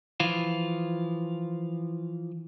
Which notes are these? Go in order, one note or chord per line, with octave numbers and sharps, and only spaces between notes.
E3 F3 F4